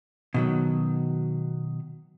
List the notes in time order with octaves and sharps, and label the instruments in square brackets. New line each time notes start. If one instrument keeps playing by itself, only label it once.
[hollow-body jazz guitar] B2 D#3 F#3